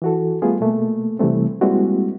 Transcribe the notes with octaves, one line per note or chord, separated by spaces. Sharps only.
E3 F#4 A4
G3 A3 B3 F4 G#4
B2 A3 A#3
C3 E3 G3 A3 C4
G3 G#3 A#3 C4 E4 F#4